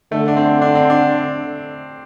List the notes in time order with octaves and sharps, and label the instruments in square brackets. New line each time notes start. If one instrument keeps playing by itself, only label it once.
[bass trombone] D3 [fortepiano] A3
[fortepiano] D4
C4
D4
C4
D4